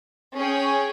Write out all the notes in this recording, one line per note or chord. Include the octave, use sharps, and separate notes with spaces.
C#4 G#4 C#5 G5